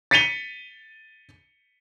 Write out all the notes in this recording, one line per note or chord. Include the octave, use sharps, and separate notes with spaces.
A6 B6 C#7 D#7 F7 G7